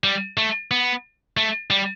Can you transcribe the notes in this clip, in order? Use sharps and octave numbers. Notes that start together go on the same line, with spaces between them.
G3
A3
B3
A3
G3